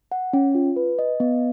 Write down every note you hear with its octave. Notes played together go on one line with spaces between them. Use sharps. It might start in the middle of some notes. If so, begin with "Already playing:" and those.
F#5
C#4
F4
B4
D#5
B3